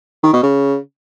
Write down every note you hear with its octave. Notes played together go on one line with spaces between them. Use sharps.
D#3
B2
C#3